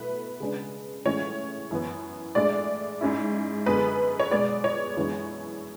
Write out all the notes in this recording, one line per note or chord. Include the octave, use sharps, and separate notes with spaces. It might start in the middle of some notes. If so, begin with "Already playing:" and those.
Already playing: B2 A3 E4 B4
C#3 G#3 D4
A2 E3 G#3 C#4 C#5
F#2 E3 B3
A2 G#3 D4 D5
G#2 G#3 C#4 E4
F#2 D3 G#3 B3 B4
C#5
B2 G#3 B3 D5
C#5
F#2 E3 G#3 B3 D4